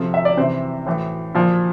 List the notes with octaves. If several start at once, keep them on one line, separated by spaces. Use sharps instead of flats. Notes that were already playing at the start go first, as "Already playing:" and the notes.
Already playing: C3 F3 A4
E5
D5
C3 E3 C5
A2 E3
A#2 F3